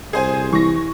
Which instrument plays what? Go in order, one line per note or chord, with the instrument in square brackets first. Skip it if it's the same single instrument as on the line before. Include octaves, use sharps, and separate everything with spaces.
[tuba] C2 [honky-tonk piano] G#4 C5 G#5
[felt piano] E3 [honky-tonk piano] C#6 A#6